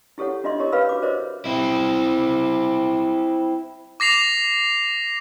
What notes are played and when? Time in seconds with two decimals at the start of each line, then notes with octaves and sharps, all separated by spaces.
0.18 E4 G4 A4 C#5 F#5
0.44 D4 F4 D#5 E5 C6
0.59 E4 G4 A#4 C#5 D#5
0.72 B4 C#5 F5 B5 E6
0.89 F#4 D6
1.02 A#4 C5 C#5 D#5 E5
1.45 C4 E4
4.00 D6 A#6 C7 F7